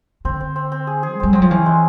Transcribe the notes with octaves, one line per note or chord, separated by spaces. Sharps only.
D3 C4
C4
C4
C4
G#4
G#4
G#3
G3 C4
F#3 C4
F3
E3 C#4
G#3